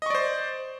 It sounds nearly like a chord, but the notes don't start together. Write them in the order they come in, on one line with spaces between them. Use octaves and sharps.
D#5 C#6 D5 C5